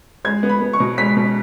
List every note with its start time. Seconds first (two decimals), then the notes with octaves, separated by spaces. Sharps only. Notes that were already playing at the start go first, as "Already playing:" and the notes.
0.25 G#3 G#6
0.43 B3
0.49 B5
0.61 B3
0.73 C#6
0.80 B2
0.98 G#3 B6
1.17 B2